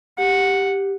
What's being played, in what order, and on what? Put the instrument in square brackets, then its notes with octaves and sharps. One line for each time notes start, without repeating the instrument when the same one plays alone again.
[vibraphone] G4 [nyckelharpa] F#5